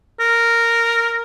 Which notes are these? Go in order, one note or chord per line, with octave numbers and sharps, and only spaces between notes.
A#4